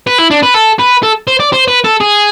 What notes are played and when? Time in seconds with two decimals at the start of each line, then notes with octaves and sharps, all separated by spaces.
0.07 B4
0.18 E4
0.30 D4
0.42 B4
0.54 A4
0.79 B4
1.03 A4
1.27 C5
1.40 D5
1.52 C5
1.68 B4
1.84 A4
2.01 G#4